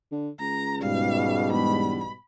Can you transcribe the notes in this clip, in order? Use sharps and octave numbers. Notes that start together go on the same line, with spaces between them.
D3
C#2 A#5
G#2 B2 G3 F5
E1 B5